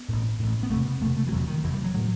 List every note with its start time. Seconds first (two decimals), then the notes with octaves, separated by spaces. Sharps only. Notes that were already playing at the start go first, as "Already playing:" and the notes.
Already playing: B3
0.08 A1 A2
0.39 A1 A2
0.63 B3
0.70 E1 E2 C3 A3
0.86 B3
1.01 E1 E2 C3 A3
1.17 A3
1.27 E3
1.32 E1 E2 C3 F#3
1.47 D#3
1.63 E1 E2 C3 E3
1.73 G3
1.84 F#3
1.94 A2 F#3